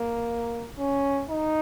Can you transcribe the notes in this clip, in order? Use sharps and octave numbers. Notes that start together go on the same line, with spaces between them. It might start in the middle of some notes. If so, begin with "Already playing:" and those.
Already playing: A#3
C#4
D#4